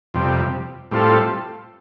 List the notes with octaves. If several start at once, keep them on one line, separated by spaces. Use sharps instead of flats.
F2 C3 G3
A2 G3 C4 F4 A4